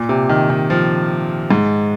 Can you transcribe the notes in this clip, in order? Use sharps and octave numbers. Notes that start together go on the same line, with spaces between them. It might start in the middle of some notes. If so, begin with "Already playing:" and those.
Already playing: A#2
C3
D#3
D#3
F3
G#2